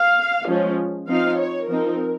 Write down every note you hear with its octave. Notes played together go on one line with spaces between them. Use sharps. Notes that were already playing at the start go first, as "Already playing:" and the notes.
Already playing: F5
F3 G#3 C#4
F3 C4 D#4 F5
C#5
F3 C4 D#4 A#4